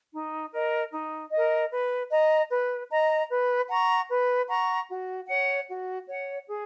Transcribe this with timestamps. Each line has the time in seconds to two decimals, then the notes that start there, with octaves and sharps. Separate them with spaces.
0.12 D#4
0.52 A#4 D#5
0.92 D#4
1.32 A#4 D#5
1.71 B4
2.11 D#5 A#5
2.51 B4
2.91 D#5 A#5
3.30 B4
3.69 F#5 A#5 C#6
4.09 B4
4.49 F#5 A#5 C#6
4.89 F#4
5.28 C#5 F#5
5.68 F#4
6.08 C#5 F#5
6.47 G#4